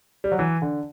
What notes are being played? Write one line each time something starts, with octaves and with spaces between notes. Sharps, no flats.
G3
F#3
E3
D3